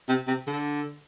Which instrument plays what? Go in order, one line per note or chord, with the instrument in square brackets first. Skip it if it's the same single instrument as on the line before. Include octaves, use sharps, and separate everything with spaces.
[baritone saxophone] C3
C3
D3